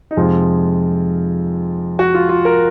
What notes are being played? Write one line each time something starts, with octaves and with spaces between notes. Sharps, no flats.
D#4
F2 C3 F3 G#3 F4
F#4
F4
F4
A#4